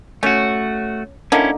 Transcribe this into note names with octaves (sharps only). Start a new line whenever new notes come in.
A3 C#4 F#4 C#5
D3 A#3 C#4 D#4 E4